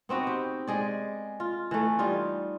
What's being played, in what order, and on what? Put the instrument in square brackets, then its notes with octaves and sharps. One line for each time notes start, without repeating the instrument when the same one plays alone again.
[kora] B3 C4 D#4 F#4
G4
G#3 G#4 D5
F4
E3 A3
G3 D#4 F4